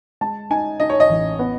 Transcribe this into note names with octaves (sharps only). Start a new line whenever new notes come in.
G#3 A5
D#4 G#5
D#4 D#5
C#5
D#5
A1
B3